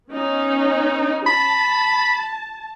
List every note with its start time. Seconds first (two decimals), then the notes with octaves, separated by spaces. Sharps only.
0.11 B3 C#4 D#4
1.26 A5 B5